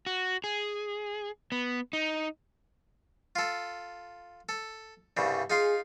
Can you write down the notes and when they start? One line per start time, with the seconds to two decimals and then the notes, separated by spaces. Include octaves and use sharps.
0.06 F#4
0.44 G#4
1.52 B3
1.93 D#4
3.36 F4 A4
4.49 A4
5.17 C2 G2 C#3
5.50 D#4 F4 G#4 C6